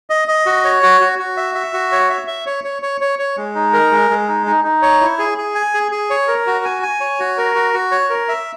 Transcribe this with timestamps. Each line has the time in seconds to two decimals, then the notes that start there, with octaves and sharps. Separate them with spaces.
0.10 D#5
0.28 D#5
0.46 F#4
0.64 C#5
0.83 F#4
1.01 F#4
1.19 F#4
1.37 E5
1.55 E5
1.73 F#4
1.92 C#5
2.10 E5
2.27 E5
2.46 C#5
2.64 C#5
2.82 C#5
3.01 C#5
3.19 C#5
3.37 G#3
3.55 D#4
3.73 A#4
3.92 G#3
4.10 G#3
4.28 D#4
4.46 D#4
4.64 D#4
4.82 C#5
5.01 E4
5.19 G#4
5.38 G#4
5.55 G#5
5.74 G#4
5.92 G#4
6.10 C#5
6.28 A#4
6.46 F#4
6.65 G#5
6.82 G#5
7.01 C#5
7.20 F#4
7.38 A#4
7.55 F#4
7.74 F#4
7.92 C#5
8.10 A#4
8.29 E5